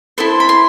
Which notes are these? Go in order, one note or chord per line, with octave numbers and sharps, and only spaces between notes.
E4 A4 C5 C6
B5
C6